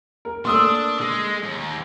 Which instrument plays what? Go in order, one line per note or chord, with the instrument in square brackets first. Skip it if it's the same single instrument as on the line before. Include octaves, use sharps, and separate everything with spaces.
[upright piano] A#4
[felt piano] A3 A#3 [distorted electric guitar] D4 [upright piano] C6 D#6 E6
[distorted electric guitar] G#3
D#2